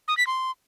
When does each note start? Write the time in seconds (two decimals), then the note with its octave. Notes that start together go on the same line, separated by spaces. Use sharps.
0.08 D#6
0.17 B6
0.27 C6